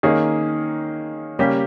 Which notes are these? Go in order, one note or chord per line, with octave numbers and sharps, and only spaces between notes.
D#3 A#3 C#4 G#4
C#3 G3 A#3 C#4 G4